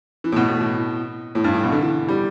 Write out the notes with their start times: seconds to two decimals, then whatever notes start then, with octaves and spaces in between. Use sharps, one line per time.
0.24 E3
0.32 A2
0.36 B2
0.48 A2
0.61 A2
1.35 A2
1.44 G2
1.54 A2
1.63 B2
1.72 D3
1.81 E3
2.08 G3